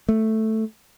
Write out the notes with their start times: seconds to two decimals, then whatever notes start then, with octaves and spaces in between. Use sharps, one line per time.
0.09 A3